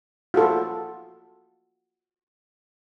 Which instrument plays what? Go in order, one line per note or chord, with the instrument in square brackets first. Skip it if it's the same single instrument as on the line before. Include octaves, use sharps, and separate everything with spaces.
[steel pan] F4 F#4 A4